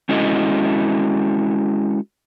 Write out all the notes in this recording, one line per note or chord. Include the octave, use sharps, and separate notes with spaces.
G#3 C#4 E4 F#4 A4 D#5